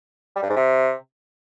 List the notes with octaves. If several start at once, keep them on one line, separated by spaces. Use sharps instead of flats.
G3
G2
G#2
C3